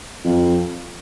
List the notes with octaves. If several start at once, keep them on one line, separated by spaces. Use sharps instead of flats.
F2